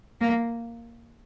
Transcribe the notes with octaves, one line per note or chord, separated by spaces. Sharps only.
A#3